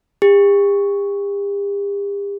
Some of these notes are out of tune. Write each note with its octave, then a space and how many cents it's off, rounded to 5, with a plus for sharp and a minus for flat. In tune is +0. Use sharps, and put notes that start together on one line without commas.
G4 +45